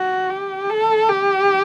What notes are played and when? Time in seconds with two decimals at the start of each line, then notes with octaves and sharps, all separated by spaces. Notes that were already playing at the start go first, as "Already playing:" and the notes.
Already playing: F#4
0.30 G4
0.70 A4
1.09 G4